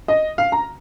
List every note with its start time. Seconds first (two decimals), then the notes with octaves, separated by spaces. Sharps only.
0.08 D#5
0.38 F5
0.52 A#5